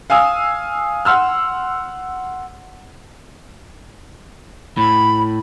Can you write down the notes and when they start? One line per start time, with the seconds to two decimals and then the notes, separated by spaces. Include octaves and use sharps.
0.10 F5 G#5 D#6 E6
1.05 F#5 C6 E6 F6
4.77 A2 B5